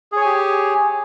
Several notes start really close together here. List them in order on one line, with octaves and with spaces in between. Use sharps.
G#4 C#5 G#5 G4